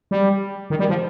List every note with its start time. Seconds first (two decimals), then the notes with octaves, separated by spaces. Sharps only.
0.11 G3
0.70 D#3
0.79 G3
0.89 F3